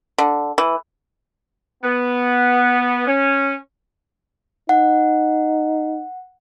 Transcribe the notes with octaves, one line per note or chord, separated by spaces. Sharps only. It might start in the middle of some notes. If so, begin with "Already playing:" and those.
D3
E3
B3
C#4
D#4 F#5